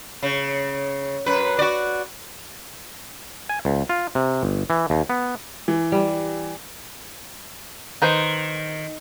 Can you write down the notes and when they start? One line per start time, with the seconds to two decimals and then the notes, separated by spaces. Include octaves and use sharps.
0.23 C#3
1.26 F#2 B4
1.59 F#4 D5
3.49 G#5
3.65 C#2
3.89 F4
4.15 C3
4.43 G1
4.70 E3
4.90 D#2
5.10 B3
5.68 E3
5.92 G3
8.02 D#3 D#4 B4 C5